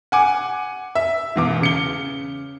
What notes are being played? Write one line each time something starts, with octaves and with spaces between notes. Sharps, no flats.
F#5 G#5 D6
E5
E1 E2 D6
C#3 C#7 G7